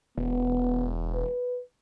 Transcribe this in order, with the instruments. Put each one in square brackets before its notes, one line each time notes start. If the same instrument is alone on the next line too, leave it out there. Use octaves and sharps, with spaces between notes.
[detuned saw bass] E1 [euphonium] B3
[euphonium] B4